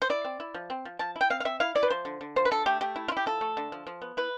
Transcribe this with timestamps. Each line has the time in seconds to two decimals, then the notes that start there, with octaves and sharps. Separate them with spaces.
0.02 C5
0.10 E4 D5
0.25 C4
0.40 E4
0.54 F3
0.70 C4
0.85 F3
0.99 F3 A5
1.16 E4
1.21 G5
1.30 C4 F5
1.40 F5
1.45 C4 E5
1.60 E4 F5
1.75 E4 D5
1.83 B4
1.90 F3 C5
2.05 D3
2.21 D3
2.36 F3 C5
2.45 B4
2.51 D3 A4
2.66 A3 G4
2.81 A3 G4
2.96 E4
3.08 F4
3.12 E4 G4
3.26 F3 A4
3.41 A3
3.57 D3
3.72 F3
3.87 F3
4.02 B3
4.17 E4 B4